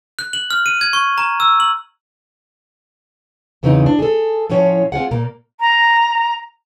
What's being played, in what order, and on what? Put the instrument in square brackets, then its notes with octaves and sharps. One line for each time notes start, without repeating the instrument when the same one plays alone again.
[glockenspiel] F#6
F#7
F6
D#7
G#6
C#6
A#5
E6
F#7
[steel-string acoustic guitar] E2 C#3 E3 C4 C#4 D#4
D4
G#4 A4
A2 F3 C#4 F4 C#5
C4 F4 G#4 F#5
A#2 A#3
[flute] A#5